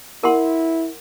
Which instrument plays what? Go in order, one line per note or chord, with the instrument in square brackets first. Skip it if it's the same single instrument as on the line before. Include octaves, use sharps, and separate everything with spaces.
[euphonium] E4 [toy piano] A#4 F#5 C6